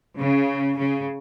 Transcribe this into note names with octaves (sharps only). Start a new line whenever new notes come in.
C#3
C#3